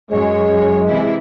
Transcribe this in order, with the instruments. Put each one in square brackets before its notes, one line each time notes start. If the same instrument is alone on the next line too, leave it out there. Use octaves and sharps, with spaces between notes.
[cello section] F#2 C#5 [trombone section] G#3
[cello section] C3 E3 E4